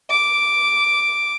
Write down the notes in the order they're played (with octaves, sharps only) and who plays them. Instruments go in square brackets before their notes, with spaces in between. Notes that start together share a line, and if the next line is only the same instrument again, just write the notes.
[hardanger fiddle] D6